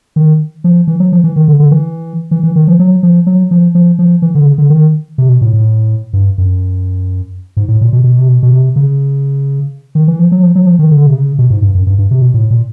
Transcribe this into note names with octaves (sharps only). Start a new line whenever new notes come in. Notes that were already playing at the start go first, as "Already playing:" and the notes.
D#3
F3
E3
F#3
F3
E3
D#3
D3
D3
E3
E3
E3
D#3
F3
F#3
F3
F#3
F3
F3
F3
E3
D3
C#3
D3
D#3
C3
B2
A2
A2
G2
F#2
G#2
A2
A#2
B2
B2
C3
B2
B2
C3
C#3
D#3
E3
F3
F#3
F3
F#3
F3
D#3
D3
C3
C#3
B2
G#2
G2
F#2
G2
G2
C3
B2
A2
A#2